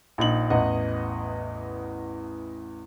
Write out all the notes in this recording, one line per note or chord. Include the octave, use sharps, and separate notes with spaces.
A#1 D#4 F#7
A1 E2 D#5 F#5